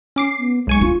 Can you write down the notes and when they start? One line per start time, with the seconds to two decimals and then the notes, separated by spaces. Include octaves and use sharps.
0.16 C#4 D6 C7
0.39 B3
0.67 B1 G#3 G#5 C#6
0.81 D4 F4